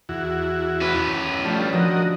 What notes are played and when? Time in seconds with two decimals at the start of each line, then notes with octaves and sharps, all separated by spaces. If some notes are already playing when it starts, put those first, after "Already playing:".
0.09 E2 E4 F#4
0.81 C#4 B4
1.44 F3 G3 A3 D4
1.73 F3 F#4 A#4 D#5